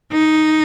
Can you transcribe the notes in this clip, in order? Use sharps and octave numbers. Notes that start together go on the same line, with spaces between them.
D#4